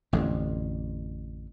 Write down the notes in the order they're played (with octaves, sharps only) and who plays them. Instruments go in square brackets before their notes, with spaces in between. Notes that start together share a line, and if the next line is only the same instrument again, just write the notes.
[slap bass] A1 F2 D3